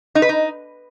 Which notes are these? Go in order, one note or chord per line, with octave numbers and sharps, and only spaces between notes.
D#4
B4
D#4